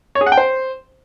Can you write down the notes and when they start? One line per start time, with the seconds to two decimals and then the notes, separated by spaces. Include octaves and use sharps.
0.15 C#5
0.21 G#4
0.26 F#5
0.32 G5
0.37 C5